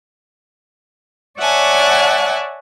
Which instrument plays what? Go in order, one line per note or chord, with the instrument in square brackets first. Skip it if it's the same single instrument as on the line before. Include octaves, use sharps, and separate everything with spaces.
[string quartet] C#5 D5 E5 F#5 G#5 A5